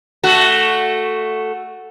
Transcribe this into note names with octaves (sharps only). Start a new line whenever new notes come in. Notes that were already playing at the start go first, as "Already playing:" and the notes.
A3 F#4